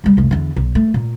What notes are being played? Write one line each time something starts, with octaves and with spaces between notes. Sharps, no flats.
C#2 G3
F1 C2
E2 D3
B1
A3
A#2